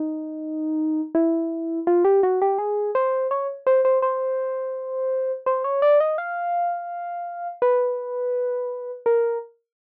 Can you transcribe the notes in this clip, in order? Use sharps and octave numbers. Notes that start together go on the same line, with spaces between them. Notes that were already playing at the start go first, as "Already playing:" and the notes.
Already playing: D#4
E4
F4
G4
F#4
G4
G#4
C5
C#5
C5
C5
C5
C5
C#5
D5
D#5
F5
B4
A#4